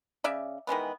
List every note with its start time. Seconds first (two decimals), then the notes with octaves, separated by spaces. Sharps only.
0.24 C#3 D5 E5
0.67 D#3 E3 G#3 B3